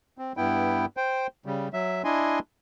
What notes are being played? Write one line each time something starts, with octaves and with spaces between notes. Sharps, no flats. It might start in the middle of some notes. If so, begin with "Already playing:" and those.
C4
G2 B3 E4 G5
C5 G5
C#3 G3
F#3 E5
D4 E4 D#5 G#5 C6